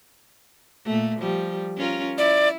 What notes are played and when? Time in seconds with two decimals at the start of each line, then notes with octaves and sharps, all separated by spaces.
0.85 A#2 A3
1.19 F3 G3
1.77 C#4 F4 A#4
2.18 E4 D5